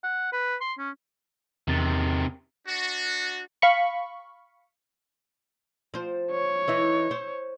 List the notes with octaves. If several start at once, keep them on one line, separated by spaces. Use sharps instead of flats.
F#5
B4
C6
C#4
E2 C3 D#3 A6
D4 F#4
F5 B5 C#6
F3 C5
C#5
E3 D#4 E4
C5